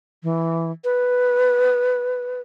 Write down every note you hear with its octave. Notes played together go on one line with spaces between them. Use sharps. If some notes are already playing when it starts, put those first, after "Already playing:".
E3
B4